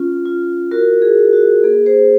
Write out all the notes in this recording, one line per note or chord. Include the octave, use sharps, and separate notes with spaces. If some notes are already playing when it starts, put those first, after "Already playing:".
Already playing: C#4 F4
F4
F#4 A#4
G#4
F#4
F#4
A#3 G#4
G#4 C5